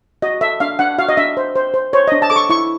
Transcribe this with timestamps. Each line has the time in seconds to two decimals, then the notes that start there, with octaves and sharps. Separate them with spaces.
0.22 F#4 D#5
0.41 A4 E5
0.60 D4 F5
0.79 D4 F#5
0.98 F#4 F5
1.09 D#5
1.17 D4 E5
1.37 C5
1.56 C5
1.74 C5
1.93 C5 C#5
2.07 D4 D#5
2.22 A5
2.30 A4 D6
2.36 C#6
2.50 E4 C#6